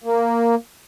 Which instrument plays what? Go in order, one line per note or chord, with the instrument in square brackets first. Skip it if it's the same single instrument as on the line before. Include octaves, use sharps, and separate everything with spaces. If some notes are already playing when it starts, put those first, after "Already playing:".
[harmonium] A#3